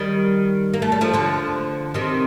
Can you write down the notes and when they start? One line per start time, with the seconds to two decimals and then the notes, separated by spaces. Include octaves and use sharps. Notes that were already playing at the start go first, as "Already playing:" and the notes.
Already playing: D#3 G3
0.74 A#3
0.82 A3
0.92 G3
1.01 F3 A3
1.14 D3 F3
1.94 C3 D#3